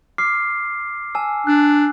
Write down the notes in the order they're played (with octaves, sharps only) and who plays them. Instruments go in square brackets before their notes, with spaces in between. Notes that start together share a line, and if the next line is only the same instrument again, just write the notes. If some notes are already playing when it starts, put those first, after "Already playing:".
[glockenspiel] D6 F6 C7
G#5 A5 E6
[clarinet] D4 [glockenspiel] F#6